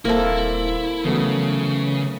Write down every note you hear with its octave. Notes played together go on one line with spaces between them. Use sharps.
D#1 A#3 C4 E4 A4
C#3 E3 F#3 A3 B3